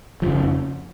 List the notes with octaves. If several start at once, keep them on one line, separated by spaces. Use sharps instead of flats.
F#1 F2 C#3 F3